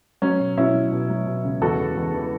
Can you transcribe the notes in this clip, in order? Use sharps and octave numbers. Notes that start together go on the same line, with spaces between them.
F#3 C#4
B2
B2 C#4 E4
F#3
B2
F#3
B2
C#2
E2 F#4 A4
E2
E2
E3